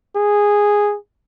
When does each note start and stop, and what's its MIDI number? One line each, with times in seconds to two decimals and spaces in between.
0.16 0.96 68